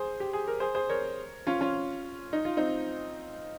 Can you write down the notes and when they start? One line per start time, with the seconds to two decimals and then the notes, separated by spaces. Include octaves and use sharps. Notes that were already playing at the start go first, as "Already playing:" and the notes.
Already playing: G#4 C5
0.20 G4
0.33 G#4
0.48 A#4
0.60 G#4 C5
0.75 G#4 C5
0.90 A#4 C#5
1.47 C#4 F4
1.61 C#4 F4
2.33 D#4
2.45 F4
2.57 C4 D#4